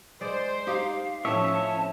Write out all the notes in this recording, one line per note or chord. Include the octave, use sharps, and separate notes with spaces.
G#3 C5 D5
D#4 G4 F5
A2 F3 C4 C#4 C#5 E5 A5